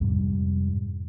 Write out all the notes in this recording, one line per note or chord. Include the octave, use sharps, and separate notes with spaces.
F2 G#2 C3 G3